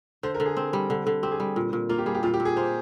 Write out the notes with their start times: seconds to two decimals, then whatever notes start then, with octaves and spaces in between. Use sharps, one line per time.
0.23 D3 C5
0.34 A#4
0.40 D3
0.46 G#4
0.57 C4
0.73 G3
0.90 D3
1.07 D3
1.23 C4 G4
1.32 G#4
1.40 G3 G4
1.56 A#2
1.73 A#2
1.89 A#3 F4
1.98 G4
2.06 G3 G#4
2.15 G4
2.23 A#2 F4
2.34 G4
2.40 A#2
2.45 G#4
2.56 A#3 C5